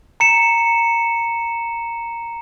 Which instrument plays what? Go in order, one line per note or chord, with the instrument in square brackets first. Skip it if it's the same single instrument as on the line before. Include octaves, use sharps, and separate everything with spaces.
[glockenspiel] A#5 C#7 E7